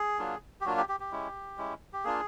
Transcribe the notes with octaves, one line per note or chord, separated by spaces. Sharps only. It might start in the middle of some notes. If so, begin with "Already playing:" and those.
Already playing: G#4
F#3 A#3 D4 F4
G4
F#3 A#3 D4 F4 F#4
G4
G4
G4
G#3 C#4 E4
G#3 C#4 E4
G4
A#3 D4 F4 G#4